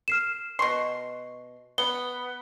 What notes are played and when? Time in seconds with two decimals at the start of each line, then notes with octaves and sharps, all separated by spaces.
0.08 F6 C7 E7
0.59 B2 C6 C#6 C7
1.78 B3 G7